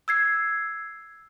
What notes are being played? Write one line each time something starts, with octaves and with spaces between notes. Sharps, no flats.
E6 G#6 C7